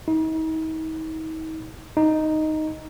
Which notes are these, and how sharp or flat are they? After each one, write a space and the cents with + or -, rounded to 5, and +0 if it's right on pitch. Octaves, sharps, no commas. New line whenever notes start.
D#4 +40
D#4 +0